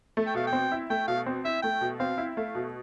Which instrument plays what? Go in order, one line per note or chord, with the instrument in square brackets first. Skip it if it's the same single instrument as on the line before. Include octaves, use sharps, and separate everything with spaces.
[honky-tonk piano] A3
[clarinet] G5
[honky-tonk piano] B2 [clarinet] F5
[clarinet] G5
[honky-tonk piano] C4
E4
[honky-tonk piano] A3 [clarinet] G5
[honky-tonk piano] B2 [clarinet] F5
[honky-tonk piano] C4
[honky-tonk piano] E4 [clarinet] E5
[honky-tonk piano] A3 [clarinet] G5
[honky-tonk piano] B2
[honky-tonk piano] C4 [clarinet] F5
[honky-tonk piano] E4
[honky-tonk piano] A3 [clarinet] F5
[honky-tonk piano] B2